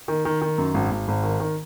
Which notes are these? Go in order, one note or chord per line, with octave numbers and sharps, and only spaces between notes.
D#3
D#3
D#3
F#2
G#1
G#1
G#1
D#3
D#3